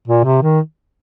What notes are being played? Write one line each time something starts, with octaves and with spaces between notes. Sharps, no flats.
A#2
C3
D#3